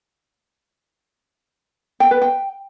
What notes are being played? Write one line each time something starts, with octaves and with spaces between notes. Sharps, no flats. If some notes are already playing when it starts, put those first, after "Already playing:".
G5
B4
G5